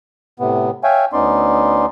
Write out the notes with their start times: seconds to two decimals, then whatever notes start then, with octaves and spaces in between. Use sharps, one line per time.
0.40 A2 C3 B3
0.84 C#5 E5 F5 G5 G#5
1.13 D2 B3 C#4 D#4 D5 C6